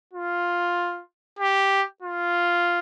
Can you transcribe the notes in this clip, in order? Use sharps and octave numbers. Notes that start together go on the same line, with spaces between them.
F4
G4
F4